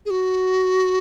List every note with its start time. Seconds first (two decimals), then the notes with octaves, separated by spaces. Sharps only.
0.05 G#4
0.10 F#4